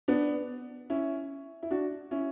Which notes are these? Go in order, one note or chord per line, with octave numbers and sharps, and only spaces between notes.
B3 D4
C#4 E4
E4
D4 F#4
C#4 E4